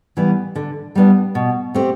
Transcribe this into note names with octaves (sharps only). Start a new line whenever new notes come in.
E3 G3 B3
D3
G3 B3 D4
B2
A3 C4 G4